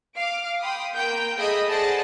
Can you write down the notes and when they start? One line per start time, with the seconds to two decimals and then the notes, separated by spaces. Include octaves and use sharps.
0.17 F5 D6
0.61 G5 B5 C6 D#6
0.95 A#3 G5 G6
1.37 G#4 A4 D#5 E5 B5 D#6
1.69 G#4 C5 D5 D#5 F#5 A5